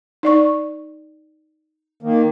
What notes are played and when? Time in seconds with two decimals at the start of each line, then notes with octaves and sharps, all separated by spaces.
0.23 D#4 D5 C#6
2.03 D#3 A#3